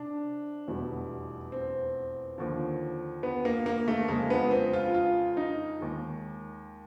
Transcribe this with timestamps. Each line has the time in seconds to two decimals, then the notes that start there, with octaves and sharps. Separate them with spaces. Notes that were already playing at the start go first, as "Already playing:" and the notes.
Already playing: C3 D4
0.68 F1 E2 B2 G3
1.52 C4
2.38 D#2 D3 F3
3.23 B3
3.45 A#3
3.66 A#3
3.88 A3
4.08 F2 C#3 F3 G#3 A#3
4.30 B3
4.51 C4
4.73 F4
4.95 F4
5.37 D#4
5.80 D#2 D#3 G#3